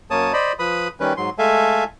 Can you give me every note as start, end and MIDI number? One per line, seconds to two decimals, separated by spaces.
0.10 0.32 42
0.10 0.32 58
0.10 0.32 73
0.10 0.32 81
0.10 0.32 87
0.33 0.53 72
0.33 0.53 74
0.33 0.53 75
0.33 0.53 83
0.59 0.88 53
0.59 0.88 71
0.59 0.88 83
0.59 0.88 87
1.00 1.13 51
1.00 1.13 55
1.00 1.13 61
1.00 1.13 71
1.17 1.30 44
1.17 1.30 54
1.17 1.30 84
1.38 1.84 56
1.38 1.84 57
1.38 1.84 69
1.38 1.84 76
1.38 1.84 77
1.38 1.84 80